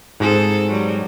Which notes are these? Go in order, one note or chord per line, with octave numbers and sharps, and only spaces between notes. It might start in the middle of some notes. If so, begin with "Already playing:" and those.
G#2 C4 G#4 A4
F#3 G3